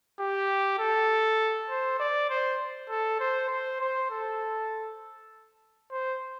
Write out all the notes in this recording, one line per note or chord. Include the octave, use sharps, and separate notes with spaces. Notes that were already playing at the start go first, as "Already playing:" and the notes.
G4
A4
C5
D5
C5
A4
C5
C5
C5
A4
C5